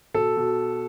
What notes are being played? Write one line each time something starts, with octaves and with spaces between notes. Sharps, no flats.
B2 A4
B2